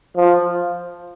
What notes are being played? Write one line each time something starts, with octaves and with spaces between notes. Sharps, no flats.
F3